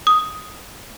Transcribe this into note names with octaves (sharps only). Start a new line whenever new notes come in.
D#6